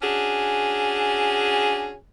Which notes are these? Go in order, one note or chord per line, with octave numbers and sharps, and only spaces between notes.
C#4 D4 F#4 G#4